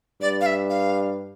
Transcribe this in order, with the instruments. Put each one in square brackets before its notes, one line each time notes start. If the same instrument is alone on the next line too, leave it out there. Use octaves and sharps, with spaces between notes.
[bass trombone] G2 [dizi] D5
[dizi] F5
E5
F5